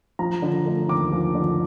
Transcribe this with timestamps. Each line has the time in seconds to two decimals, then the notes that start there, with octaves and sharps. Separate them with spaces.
0.19 F3 A#5
0.42 D3
0.65 A3
0.88 D#2 D6
1.12 F3
1.35 D3